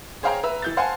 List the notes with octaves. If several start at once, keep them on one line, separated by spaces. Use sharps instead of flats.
G#4 C5 C#5 F5 G5 A#5
B4 E5 A#5 E6
E3 G6 A6
C5 F5 F#5 G#5 A5 C6